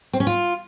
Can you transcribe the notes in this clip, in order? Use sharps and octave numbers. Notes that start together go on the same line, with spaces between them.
C4
C#4
F4